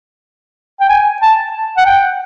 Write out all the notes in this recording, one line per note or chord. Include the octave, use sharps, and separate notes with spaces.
G5
G#5
A5
F#5
G5